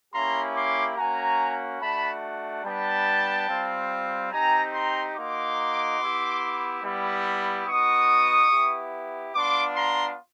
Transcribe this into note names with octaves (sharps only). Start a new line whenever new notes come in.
A#3 C#4 E4 G4 A#5 C6
C6 D6
A#3 C#4 F#4 G#5 A#5
A3 D4 F#4 A5 B5
G3 B3 D4 G5 A5
G3 C4 F4
C4 D#4 G4 G#5 A#5
A#5 C6
A#3 D#4 F#4 C6 D6
B3 E4 G4
G3 B3 E4 G4
B3 D#4 F#4 C#6 D#6
B3 E4 G4
B3 D4 F4 C6 D6
A#5 C6